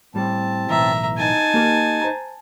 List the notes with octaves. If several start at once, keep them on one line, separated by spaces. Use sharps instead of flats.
A2 G3 C4 A5
B1 A2 E3 E5 A#5
D#4 G#5 A5
A#3 G4 A#4
C5 A#5